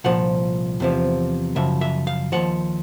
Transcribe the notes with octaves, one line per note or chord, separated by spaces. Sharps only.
C2 A#2 F3 F#5
E2 C3 F3
F#2 C#3 F3 E5
E5
F5
D#2 C#3 F3 F#5